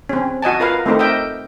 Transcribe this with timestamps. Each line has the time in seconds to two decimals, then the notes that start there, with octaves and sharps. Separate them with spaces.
0.09 C4 C#4
0.42 F#4 D#5 G#5 A5
0.60 F4 A#4 B4 F5
0.86 A3 C4 D#4 A#4
0.99 D#5 E5 G5